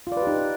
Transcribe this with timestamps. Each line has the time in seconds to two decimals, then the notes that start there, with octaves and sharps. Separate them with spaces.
0.07 F4
0.12 D5
0.17 B4
0.22 G4
0.27 D#4